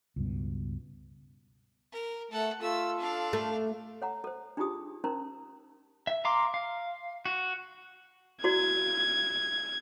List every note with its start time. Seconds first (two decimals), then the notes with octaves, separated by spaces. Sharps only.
0.16 C#2 G2 B2
1.92 A#4
2.31 A3 A4 F#5
2.61 A3 F4 A4 E6
2.98 D4 F5
3.33 A3
4.02 C#5 F#5 A#5
4.24 A4 C5
4.57 D4 D#4 F4 G4 G#4 D#6
5.04 C#4 D#4 A#4 C5 A#5 C6
6.07 E5
6.25 F5 A#5 C6 D6
6.54 F5
7.25 F#4
8.44 E4 F#4 D5 G#6